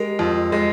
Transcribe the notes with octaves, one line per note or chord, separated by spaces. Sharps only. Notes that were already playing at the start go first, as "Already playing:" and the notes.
Already playing: G#3 G4 A#4
F2
G#3